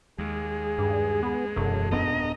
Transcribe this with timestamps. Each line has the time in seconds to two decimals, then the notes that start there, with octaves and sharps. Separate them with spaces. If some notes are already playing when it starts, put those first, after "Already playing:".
0.18 D#2 G#3 G#4
0.78 G2
1.23 B3 G#4
1.56 E1 F#2 A4
1.91 D#1 B3 D4 D#5 A#5